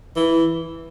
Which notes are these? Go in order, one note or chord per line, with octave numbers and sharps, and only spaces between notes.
E3